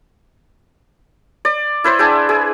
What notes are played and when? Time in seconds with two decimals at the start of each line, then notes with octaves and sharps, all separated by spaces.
1.45 D5
1.84 E4 B4 C5
1.99 D4 E4 G#4 G5
2.29 G#4